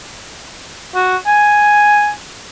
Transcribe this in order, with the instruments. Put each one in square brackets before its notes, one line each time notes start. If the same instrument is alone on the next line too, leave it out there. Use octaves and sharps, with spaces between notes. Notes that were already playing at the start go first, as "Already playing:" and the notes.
[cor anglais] F#4
G#5